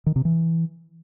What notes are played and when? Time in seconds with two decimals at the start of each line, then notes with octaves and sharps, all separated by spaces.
0.06 D#3
0.16 C3
0.25 E3